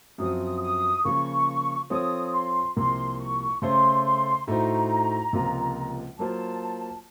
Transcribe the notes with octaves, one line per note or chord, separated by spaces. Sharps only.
F#2 F3 C4 F#4 D#6
D#6
C#3 F3 A#3 C#6
F3 C4 F4 A4 C#5 D#6
C6
C2 C3 F3 A#3 C6
C#6
C#3 A3 C#4 A4 C5 C6
C6
A2 A3 D#4 F#4 C5 A#5
C#2 C3 F3 A#3 F4
F#3 A#3 F4 C5 A5